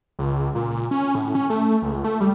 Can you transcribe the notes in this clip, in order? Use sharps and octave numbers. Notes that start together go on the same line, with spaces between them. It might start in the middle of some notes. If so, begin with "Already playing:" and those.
C#2
A#2
A#2
C#4
A2
C#4
A3
C#2
A3
G3